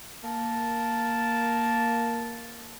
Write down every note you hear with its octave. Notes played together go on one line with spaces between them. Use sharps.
A#3 A5